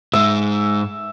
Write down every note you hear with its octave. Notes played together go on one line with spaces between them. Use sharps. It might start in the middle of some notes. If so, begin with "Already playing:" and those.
G#2 G#3 E5